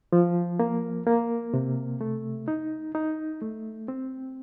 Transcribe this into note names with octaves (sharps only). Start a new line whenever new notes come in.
F3
A#3
A#3
C3
A3
D#4
D#4
A3
C4